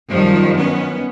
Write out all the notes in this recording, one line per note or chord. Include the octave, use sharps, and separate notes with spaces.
F#2 D#3 F3 G3
B3 C#4